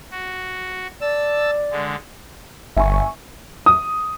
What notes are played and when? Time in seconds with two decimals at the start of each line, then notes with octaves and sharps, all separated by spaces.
0.11 F#4
1.01 D5 A5 E6
1.71 D3 G#3
2.77 G1 E5 G#5 C#6
3.66 D#6